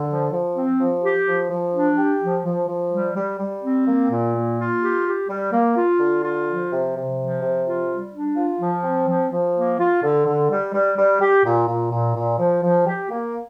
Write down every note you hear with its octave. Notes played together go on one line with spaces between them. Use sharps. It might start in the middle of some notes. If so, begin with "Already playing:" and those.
Already playing: D3
F3
F3
C4
F3
G4
F3
F3
D4
G4
F3
F3
F3
G3
G3
G3
C4
A#3
A#2
A#3
F4
G4
G4
G3
A#3
F4
D3
F4
F3
C3
C3
F3
C3
F4
G3
D4
F4
F3
C4
F3
F3
A#3
F4
D3
D3
G3
G3
G3
G4
A#2
A#2
A#2
A#2
F3
F3
G4
A#3